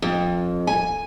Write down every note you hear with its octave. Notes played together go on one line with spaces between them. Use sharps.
F2
G#5